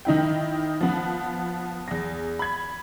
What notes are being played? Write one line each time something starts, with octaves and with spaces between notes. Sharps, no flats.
D#3 D#4 E4 G5
F3 B3
E2 A#6
B5 G#6